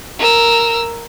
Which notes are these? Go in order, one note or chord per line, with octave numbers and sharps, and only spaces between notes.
A#4 E6